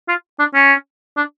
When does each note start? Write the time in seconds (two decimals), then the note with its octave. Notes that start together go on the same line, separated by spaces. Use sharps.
0.08 F4
0.39 D4
0.54 C#4
1.17 D4